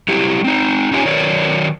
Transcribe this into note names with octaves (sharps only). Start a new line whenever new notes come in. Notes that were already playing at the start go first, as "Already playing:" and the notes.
F#3 G3 E4 G4
C4 D#4
C#4 D#4 F4 G4 C#5 G#5
D#3 F#3 A#4 C#5 D5